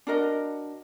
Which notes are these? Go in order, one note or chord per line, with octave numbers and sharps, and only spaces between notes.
D4 F#4 A#4 D#5